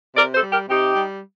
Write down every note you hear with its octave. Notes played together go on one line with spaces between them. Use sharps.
C3 A#4 D5
A4 C5
G3
G4 A#4
C3 D#4 G4
G3